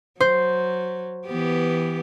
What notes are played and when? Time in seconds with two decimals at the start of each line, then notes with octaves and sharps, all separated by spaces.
0.20 F#3 C5
1.27 E3 B3 G4